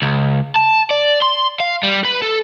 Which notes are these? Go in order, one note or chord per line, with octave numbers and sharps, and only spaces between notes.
C#2
A5
D5
C6
F5
G3
B4
A4